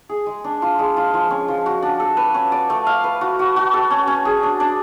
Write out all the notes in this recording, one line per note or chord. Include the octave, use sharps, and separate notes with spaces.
G#4
G#3
D4
F4
G#3
F4
F3
C#4
F3
F#4
D4
A4
B4
C#4
D5
A3
F5
B4
F#4
F#4
F#4
A4
C#4
C#4
G#4
D4
D4